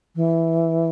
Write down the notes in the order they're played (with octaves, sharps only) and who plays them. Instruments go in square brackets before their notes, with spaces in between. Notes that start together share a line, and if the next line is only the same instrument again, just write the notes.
[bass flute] E3